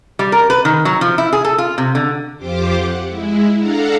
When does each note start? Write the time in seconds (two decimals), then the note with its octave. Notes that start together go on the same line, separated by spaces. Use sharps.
0.19 G3
0.32 A#4
0.50 B4
0.65 D#3
0.85 F#3
1.01 F3
1.18 E4
1.33 G#4
1.45 A4
1.58 F4
1.78 C3
1.95 D3
2.37 F2 F4 G4 C5 D6
2.74 F#5
3.05 G#3 E4
3.56 D4 A4 F5 F#5 A#5